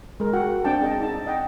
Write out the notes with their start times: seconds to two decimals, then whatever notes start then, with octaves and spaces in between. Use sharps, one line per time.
0.20 G#3 A#4
0.33 F#4 F#5 G5
0.64 C4 D4 G5 A5
0.82 G#4 D#5 A5
1.00 D#4 A5
1.26 D#5 F#5 G5